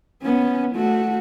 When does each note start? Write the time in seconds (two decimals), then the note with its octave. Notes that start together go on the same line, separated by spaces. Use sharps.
0.23 B3 C#4
0.76 A3 F#4